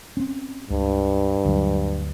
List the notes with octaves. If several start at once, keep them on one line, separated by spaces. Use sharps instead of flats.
C4 C#4
C#2 G2
D2 F#3